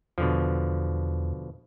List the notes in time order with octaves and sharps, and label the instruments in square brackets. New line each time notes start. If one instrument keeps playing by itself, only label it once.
[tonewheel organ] E2 [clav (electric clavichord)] B2 D3 F3